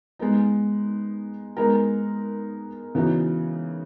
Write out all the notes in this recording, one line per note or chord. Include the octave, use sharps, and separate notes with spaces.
G#3 B3 D#4
G#3 B3 D#4 A#4
C#3 E3 B3 D#4 F#4